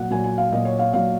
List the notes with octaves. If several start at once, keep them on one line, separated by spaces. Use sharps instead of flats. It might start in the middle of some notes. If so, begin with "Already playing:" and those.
Already playing: A#2 F#3 F#5
A#2 F#3 G#5
G#5
F5
A#2 F#3 D#5
C#5
F5
A#2 F#3 F5